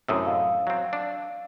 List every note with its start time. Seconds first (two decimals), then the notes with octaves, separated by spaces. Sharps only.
0.09 F#2 A2 C3 D#6 E6
0.25 D#5 F5 E6
0.67 F#3 C4
0.93 D4